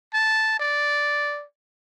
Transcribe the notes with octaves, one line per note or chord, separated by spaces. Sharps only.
A5
D5